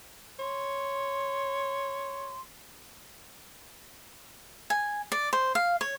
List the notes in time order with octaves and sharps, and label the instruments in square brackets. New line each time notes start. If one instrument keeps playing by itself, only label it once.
[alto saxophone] C#5 [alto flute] C6
[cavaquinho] G#5
D5
C5
F5
C#5